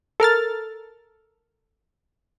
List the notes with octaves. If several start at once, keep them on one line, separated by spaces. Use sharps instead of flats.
A4 A#4 F6 A6